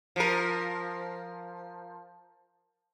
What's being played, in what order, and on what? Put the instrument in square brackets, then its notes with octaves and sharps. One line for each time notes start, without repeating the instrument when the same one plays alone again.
[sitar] F3 A#4